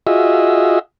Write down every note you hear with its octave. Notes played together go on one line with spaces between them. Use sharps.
F4 F#4 G#4 D#5 E5